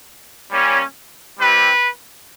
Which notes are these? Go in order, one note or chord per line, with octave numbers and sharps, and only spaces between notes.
G3 A#3 C#4
G3 C4 E4 G4 B4